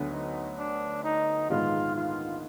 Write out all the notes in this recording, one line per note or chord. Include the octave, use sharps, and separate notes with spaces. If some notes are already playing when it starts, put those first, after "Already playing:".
Already playing: D2 D3 F#3 B3
D#4
D4
D#4
A#1 G#2 D#3 G#3 B3 F4
F4